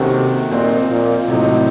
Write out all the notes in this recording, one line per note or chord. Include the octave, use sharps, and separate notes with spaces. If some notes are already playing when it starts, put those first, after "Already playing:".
Already playing: C3 D#3 A#3 C#4 F#4 A4
A#2 F3 C4 D#4
A#2
A2 C3 F#3 C4 D#4